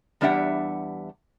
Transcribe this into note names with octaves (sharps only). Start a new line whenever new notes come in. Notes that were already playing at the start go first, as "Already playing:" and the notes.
E2 G3 D4 G4 E5 F#5